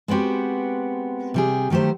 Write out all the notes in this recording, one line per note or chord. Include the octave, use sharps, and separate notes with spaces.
G#3 B3 C4 F#4 G4
C3 G3 G#4
D#3 F#3 A3 G4 C5